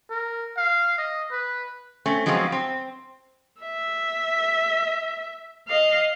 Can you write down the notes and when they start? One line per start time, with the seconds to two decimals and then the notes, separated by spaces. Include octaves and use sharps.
0.10 A#4
0.57 F5
0.98 D#5
1.32 B4
2.06 A3 C4 C#4
2.26 F3 F#3 G#3 B3 C4 F4
2.52 C4
3.61 E5
5.68 D#5 F5